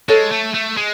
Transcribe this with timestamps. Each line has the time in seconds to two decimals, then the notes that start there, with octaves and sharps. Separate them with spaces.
0.08 G#3 A4 C#5
0.31 A3
0.54 A3
0.77 G#3